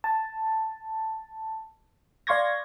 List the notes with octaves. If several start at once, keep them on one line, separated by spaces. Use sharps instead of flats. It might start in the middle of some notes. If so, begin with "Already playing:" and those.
A5
D5 F5 C6 C#6 G#6 A#6